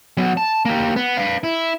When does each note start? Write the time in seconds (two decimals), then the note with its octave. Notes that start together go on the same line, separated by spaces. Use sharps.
0.17 F#3 B3
0.37 A5
0.65 A#3 G4
0.96 B3
1.17 B4 F5
1.44 E4